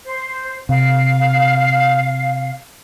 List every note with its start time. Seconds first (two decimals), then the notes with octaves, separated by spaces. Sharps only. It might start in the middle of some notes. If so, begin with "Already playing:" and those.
0.05 C5
0.69 C3 F5